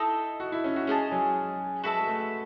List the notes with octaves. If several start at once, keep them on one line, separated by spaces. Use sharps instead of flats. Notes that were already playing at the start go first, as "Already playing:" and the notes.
Already playing: D#4 E4 A4 D#5
F#4
E4
C#4
F#4
G#3 C#4 G#4 D#5 A5
F#3
G#3 F#4 B4 E5 A5
G#3
A3